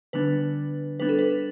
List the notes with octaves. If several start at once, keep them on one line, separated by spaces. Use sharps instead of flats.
D3 G3 B3 D4 B4
G3 B3 D4 B4
A4
B4